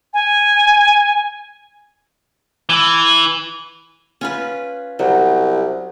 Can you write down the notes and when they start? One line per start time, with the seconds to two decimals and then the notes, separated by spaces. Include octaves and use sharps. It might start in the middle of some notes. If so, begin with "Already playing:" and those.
0.14 G#5
2.69 E3
4.21 C#4 F4 B4
4.99 C2 F#3